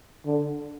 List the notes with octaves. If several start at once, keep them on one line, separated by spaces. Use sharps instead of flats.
D3